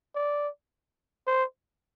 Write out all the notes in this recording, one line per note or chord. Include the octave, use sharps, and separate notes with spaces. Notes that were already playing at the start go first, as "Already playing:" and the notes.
D5
C5